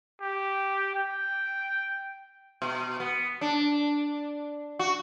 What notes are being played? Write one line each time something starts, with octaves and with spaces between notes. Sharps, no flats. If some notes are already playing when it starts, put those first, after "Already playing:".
G4
G5
B2
B3
D4
F#4